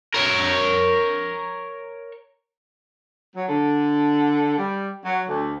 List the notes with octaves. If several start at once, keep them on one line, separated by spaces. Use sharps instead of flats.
A#4 C#5
F#3
D3
G3
F#3
D2